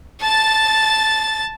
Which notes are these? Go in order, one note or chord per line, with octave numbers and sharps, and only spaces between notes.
A5 A6